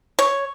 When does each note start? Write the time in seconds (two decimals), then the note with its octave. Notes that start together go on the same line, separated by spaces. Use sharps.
0.19 C#5